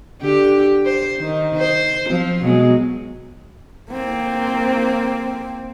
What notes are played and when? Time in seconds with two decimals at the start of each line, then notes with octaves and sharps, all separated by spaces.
0.22 D3 G4
0.85 C5
1.20 D#3
1.57 C5
2.08 F3 C4
2.42 B2 F#3 G#3
3.92 A#3 C4